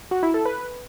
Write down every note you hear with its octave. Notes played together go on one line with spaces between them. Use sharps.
F#4
E4
A4
B4